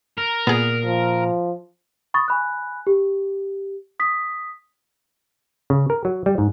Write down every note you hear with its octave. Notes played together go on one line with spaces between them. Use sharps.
A#4
A#2 B3 G#4
F3
B5 C#6 D#6 A6
G#5 B5 F#6
G4
D#6 B6
C#3
A#4
F#3
G3
G#2